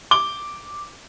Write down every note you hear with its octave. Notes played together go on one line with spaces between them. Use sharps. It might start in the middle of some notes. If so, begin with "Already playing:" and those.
D6 G7